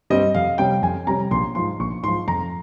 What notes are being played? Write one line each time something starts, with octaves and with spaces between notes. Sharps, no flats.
G2 G3 C4 D#5
F2 F5
C3 G3 C#4 G5
F2 G#5
C3 G3 C#4 A#5
A#1 C6
G#2 F3 C6
A#1 C#6
G#2 F3 C6
F2 A#5